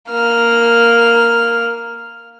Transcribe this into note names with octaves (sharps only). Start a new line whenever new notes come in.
A#3 F6